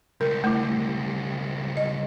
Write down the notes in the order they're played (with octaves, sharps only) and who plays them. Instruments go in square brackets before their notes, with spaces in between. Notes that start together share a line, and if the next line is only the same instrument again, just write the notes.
[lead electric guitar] C#2 G3 [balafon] A#4
[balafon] A3 E4
D#5